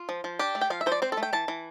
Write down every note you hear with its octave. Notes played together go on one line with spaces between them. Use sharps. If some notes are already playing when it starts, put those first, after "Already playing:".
Already playing: F4
F3
F3
D4 G4
A3
G5
F3 F5
E5
F3 C5
D5
C4 C5
A4
A3
G5
E3 A5
E3